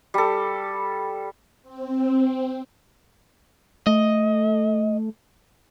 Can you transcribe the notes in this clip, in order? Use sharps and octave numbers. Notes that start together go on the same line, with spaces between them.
G3 A4
C4
A3 D#5